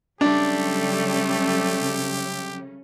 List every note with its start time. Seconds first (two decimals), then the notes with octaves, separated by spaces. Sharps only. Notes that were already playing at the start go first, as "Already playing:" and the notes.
0.21 C#3 F#3 G3 A3 C#4 D4 G4 A4